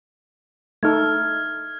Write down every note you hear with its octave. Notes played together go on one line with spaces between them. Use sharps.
A3 D#4 A4 F6 G#6